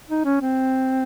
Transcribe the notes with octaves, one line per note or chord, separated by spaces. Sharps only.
D#4
C#4
C4